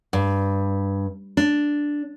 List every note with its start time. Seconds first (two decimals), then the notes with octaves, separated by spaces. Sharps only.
0.13 G2
1.37 D4